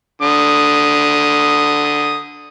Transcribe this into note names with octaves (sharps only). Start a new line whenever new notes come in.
D3 D#6